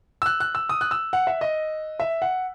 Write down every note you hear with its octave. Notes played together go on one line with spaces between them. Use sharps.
E6
F#6
F#6
E6
D#6
F#6
E6
F#5
E5
D#5
E5
F#5